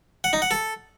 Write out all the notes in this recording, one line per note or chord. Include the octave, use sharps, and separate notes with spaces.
F#5
D#4
F#5
A4